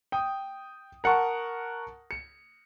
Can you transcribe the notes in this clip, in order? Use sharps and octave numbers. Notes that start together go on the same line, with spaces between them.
G5 D#6
A#4 F#5 A5 C#6
C#7